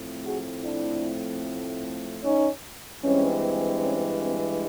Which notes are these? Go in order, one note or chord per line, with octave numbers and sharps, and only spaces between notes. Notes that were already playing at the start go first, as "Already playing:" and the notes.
Already playing: A2 F3 A3 C4
F#4 G#4
D4 E4
C#4 D#4
G2 E3 G#3 C4 C#4
C#4
C4